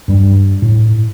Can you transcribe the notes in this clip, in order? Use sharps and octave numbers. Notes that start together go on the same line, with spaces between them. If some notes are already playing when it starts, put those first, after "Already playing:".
G2 G3
A2